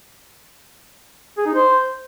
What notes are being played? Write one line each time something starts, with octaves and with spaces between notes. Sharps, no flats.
G#4
D#4
C5